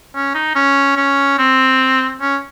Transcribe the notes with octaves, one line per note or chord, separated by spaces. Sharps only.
C#4
D#4
C#4
C#4
C4
C#4